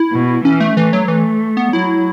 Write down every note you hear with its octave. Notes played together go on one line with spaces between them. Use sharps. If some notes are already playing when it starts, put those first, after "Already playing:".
Already playing: E4
B2
E3 C#4
A3
E3 A3
F#3
E3 A3
B3
F#3 E4